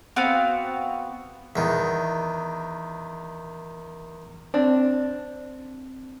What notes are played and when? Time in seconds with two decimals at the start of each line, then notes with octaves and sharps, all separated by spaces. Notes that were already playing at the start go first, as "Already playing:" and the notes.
0.16 B3 C4 F#4 F5
1.56 E2 D#3
4.54 C4 D4